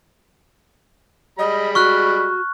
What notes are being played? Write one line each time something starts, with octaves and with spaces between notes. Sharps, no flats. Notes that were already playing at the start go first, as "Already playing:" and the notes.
G3 G#3 D#5 B5
F#4 C#6 F6 F#6